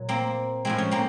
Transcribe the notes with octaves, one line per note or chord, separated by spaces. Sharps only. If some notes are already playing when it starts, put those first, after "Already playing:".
Already playing: A#2 F#3
A#3 C4
A2 F3 G#3 C4
C#4
A#3 C4